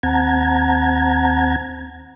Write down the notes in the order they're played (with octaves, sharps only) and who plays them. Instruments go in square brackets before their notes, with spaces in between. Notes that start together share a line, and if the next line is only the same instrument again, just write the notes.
[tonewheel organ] D#2 C4 F#5 A5 A#5 G#6